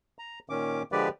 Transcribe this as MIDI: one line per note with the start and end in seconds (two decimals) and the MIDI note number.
0.19 0.39 82
0.50 0.83 46
0.50 0.83 51
0.50 0.83 61
0.50 0.83 86
0.92 1.09 50
0.92 1.09 53
0.92 1.09 56
0.92 1.09 67
0.92 1.09 71
0.92 1.09 74